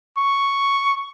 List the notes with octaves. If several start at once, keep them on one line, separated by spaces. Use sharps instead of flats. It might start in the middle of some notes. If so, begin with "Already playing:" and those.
C#6